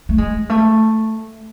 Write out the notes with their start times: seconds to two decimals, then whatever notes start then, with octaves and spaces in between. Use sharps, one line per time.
0.09 A3
0.18 G#3
0.50 A3